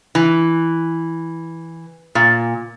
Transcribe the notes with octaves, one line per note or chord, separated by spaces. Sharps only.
E3
A#2